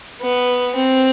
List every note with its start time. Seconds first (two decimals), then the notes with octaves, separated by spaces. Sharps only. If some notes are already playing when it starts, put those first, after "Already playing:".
0.22 B3
0.76 C4